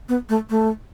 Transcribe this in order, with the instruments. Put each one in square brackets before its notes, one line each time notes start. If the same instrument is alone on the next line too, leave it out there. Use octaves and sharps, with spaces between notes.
[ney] B3
A3
A3